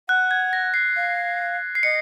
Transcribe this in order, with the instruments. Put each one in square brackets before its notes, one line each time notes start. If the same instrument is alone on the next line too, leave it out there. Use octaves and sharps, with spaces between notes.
[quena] F#5 [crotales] F#6
[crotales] G#6
A#6
C7
[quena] F5
[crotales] C7
[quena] D#5 [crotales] C#7